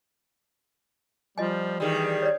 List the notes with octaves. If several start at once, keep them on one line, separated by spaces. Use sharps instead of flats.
F3 G3 F4 D#5 G#5
D#3 E3 G3 G#4
C#5 D5